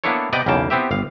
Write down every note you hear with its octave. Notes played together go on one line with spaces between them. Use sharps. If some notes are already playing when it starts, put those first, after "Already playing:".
A#3 B3 D4 E4 A4 C#5
C3 B3 D5 D#5 G5
B1 E2 C#3 A#3 G5 A5
B3 C4 E4 G4 E5
G1 F5